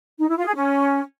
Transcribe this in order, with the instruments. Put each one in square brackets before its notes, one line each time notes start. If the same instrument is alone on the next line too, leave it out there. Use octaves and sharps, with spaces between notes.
[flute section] D#4
E4
F4
G#4
C#4